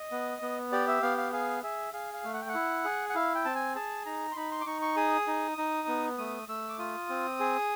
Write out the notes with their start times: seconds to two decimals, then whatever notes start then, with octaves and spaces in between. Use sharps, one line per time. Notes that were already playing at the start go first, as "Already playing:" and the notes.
Already playing: D#5
0.12 B3
0.42 B3
0.72 G4 D5
0.88 E5
1.02 B3 F5
1.18 F5
1.33 G#4 F5
1.63 G#4 E5
1.93 G#4 F5
2.14 F5
2.24 A3
2.34 F#5
2.42 G5
2.49 F#5
2.54 E4
2.85 G#4
3.09 F#5
3.15 E4 F5
3.35 G5
3.45 C4 A5
3.55 G#5
3.76 G#4 A5
4.06 D#4 A#5
4.32 C6
4.36 D#4 B5
4.51 C6
4.61 D6
4.66 D#4 C#6
4.82 C#6
4.96 G#4 D#6
5.27 D#4
5.58 D#4
5.88 B3
6.18 A3 D#6
6.48 A3 E6
6.69 D6
6.79 F4 D#6
7.09 C4
7.40 G#4